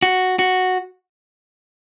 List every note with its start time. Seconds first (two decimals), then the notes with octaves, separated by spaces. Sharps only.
0.02 F#4
0.39 F#4